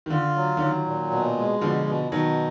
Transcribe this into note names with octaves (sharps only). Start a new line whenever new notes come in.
D#3
D3 F4
F#3
D3
D#3 F#3
A#2
B2
G#3
B2 D3 F3
B2
B2 D#3 F#3